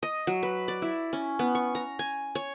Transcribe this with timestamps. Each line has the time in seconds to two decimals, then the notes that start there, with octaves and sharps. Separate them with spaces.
0.03 D#5
0.27 F#3
0.43 B4
0.68 D5
0.82 E4
1.13 C#4
1.39 B3
1.55 C#6
1.75 A#5
1.99 G#5
2.35 C#5